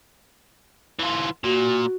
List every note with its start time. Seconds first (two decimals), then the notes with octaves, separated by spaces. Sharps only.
0.99 E3 F4
1.44 A#2 F#4